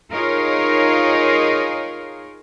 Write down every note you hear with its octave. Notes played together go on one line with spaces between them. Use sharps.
D#4 F4 G#4 A#4 C#5